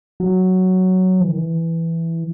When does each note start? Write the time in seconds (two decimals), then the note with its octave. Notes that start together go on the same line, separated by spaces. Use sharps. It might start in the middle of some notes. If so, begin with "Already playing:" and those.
0.20 F#3
1.20 E3
1.28 D#3
1.36 E3